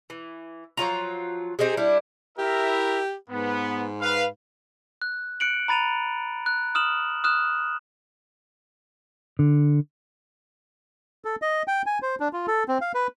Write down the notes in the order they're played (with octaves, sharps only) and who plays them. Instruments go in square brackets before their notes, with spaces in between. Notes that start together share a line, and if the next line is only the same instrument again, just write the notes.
[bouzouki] E3
F3 F#3 F4 A#5
C4 D#4 G4 G#4
G3 D4 E4
[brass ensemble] E4 A#4 E5 [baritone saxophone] G4
[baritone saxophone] G#2 [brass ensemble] B3
[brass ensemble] B4 F5
[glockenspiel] F#6
F#6 C#7 D7 F#7
A#5 B5 A6 D#7 F7
F#6
D#6 F6 E7 F#7
D#6 F6 F#6 E7
[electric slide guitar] D3
[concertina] A4
D#5
G5
G#5
C5
D4
F4
A4
C4
F5
B4